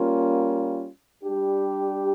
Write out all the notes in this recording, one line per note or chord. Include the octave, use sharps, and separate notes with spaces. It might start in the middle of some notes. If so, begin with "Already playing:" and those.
Already playing: G3 A#3 C#4 F4
G3 D4 G4